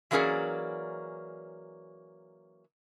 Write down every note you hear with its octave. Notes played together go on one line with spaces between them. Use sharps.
E3 F#3 A#3 C#4 G#4 D5